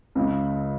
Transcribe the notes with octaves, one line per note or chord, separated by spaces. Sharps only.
C#2 C#3